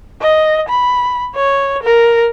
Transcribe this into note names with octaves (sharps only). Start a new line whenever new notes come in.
D#5
B5
C#5
A#4